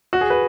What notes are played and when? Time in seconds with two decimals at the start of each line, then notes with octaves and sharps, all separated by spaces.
0.13 F#4
0.21 G#4
0.30 B4